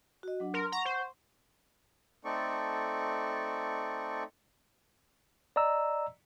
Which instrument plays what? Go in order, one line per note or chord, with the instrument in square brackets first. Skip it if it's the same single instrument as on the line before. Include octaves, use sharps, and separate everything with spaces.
[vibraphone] F#4 D#5
F#3 D4 F#5
[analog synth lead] A#4 [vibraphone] C6
[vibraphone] F#5 C#6 [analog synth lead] A#5
[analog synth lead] C5
[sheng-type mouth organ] A3 C4 D#4 A4 D5 C#6
[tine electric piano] D5 D#5 A#5 E6